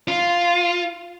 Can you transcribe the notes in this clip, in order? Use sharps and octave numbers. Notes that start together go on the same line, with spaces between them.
F4